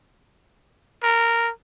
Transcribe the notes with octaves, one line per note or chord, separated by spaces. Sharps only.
A#4